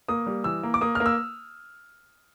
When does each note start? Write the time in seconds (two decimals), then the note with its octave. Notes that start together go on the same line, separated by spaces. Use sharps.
0.08 A#3 D#6
0.26 G3
0.44 E3 E6
0.63 A#3
0.74 D6
0.81 A#3 D#6
0.95 A#3 F6
1.06 E6